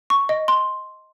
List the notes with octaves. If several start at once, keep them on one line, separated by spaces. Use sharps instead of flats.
C#6
D#5
C6